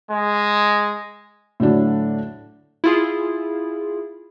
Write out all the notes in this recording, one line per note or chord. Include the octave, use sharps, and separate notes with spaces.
G#3
A2 D3 F#3 D4
E4 F4 G#4